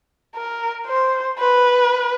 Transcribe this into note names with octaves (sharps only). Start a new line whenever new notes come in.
A#4
C5
B4